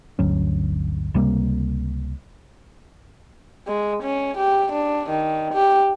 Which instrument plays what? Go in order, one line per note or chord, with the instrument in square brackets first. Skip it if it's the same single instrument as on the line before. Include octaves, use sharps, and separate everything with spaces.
[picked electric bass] G1 D2 F#3 C#4
C#2 C3 G3 A#3
[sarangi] G#3
C#4
G4
D4
D#3
G4